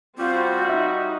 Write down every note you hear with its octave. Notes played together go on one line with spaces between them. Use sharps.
G3 C4 F4 F#4 C5
D#4 E5